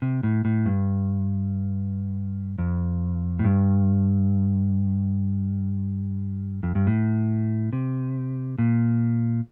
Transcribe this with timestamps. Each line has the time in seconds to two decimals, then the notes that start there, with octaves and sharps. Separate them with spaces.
0.02 C3
0.23 A2
0.45 A2
0.66 G2
2.58 F2
3.39 A2
3.44 G2
6.63 F2
6.75 G2
6.87 A2
7.73 C3
8.58 A#2